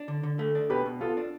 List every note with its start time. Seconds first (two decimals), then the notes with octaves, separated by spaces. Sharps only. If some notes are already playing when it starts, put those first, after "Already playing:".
Already playing: D4
0.08 D3
0.23 D3
0.39 A3
0.55 D4
0.70 B2 G4 B4
0.86 B2
1.01 B3 F4 A4
1.17 D4